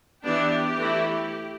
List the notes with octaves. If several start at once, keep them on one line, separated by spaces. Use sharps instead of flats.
E3 B3 D4 G4
E3 A3 E4